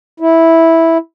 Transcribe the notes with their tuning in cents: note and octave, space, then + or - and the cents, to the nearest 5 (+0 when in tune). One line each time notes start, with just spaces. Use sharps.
E4 -5